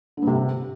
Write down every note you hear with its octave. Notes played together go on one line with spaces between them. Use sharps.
D3
G2
C3